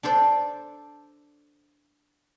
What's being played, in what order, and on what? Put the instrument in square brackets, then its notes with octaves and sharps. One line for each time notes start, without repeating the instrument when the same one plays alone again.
[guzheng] D4 A4 C5 D5